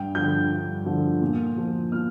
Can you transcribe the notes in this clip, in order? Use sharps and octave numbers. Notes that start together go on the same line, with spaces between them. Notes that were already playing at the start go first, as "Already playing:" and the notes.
Already playing: G2 G5
D3 F3 G6
G2
D3 F3
A#2
F3
A#2 F6